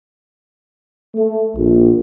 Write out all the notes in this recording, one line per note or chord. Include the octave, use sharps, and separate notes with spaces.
A3
A#1